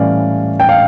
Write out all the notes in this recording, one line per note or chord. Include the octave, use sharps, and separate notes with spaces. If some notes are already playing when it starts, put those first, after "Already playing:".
Already playing: A2 E3 G3 C#4 D5 F5
G5
F5